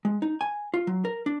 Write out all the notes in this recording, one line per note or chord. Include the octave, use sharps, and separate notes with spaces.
G#3
D#4
G#5
F4
F#3
A#4
D4